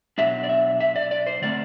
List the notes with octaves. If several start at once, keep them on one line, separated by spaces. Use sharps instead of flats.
B2 F#3 B3 D4 E5
D5
E5
E5
D5
D5
C5
D3 A3 C4 D5